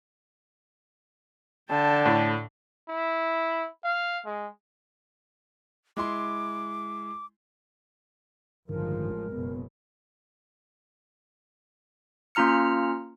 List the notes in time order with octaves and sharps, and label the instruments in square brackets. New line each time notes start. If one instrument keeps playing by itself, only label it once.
[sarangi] D3 [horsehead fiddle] G5 A5
[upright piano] A2
[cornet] E4
F5
G#3
[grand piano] G#3 E4 C6 [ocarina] D6
[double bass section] A1 F3 G#3 [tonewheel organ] G2 D3 D#3 [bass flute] A#4
[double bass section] F#1 B2 [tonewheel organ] B3
[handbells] A#3 C#4 F4 A#5 F6 C#7